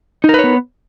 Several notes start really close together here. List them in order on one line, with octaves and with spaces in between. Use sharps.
D#4 A#4 B4 C#5 B3